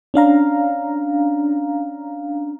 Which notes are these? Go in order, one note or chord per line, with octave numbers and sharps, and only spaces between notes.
C#4 D4 F5 A#5